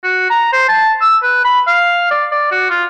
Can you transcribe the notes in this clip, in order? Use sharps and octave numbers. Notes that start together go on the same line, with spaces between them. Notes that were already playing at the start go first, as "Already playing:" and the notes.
F#4
A#5
C5
A5
E6
B4
B5
F5
D5
D5
F#4
F4